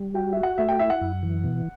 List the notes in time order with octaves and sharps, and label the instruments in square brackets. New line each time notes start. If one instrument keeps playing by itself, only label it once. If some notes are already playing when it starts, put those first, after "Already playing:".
Already playing: [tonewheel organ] G3
[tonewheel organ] F#4 [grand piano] G5
[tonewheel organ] F#4 [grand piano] E5
[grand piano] F#5
[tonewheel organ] A3 [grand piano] E5
[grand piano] G5
[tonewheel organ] E4 [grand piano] E5
[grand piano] F#5
[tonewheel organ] F#2
E3
B2